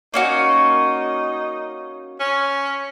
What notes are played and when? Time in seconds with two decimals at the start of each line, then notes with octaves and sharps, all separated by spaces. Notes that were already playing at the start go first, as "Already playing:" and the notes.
0.14 A#3 C#4 D#4 F#4
2.20 C#4